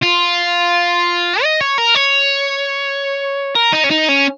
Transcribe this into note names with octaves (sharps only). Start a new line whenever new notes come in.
F4
D#5
C#5
A#4
C#5
A#4
D#4
C#4
D#4
C#4